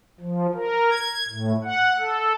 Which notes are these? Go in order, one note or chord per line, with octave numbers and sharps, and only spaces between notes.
F3
A#4
G#6
A2
F#5
A4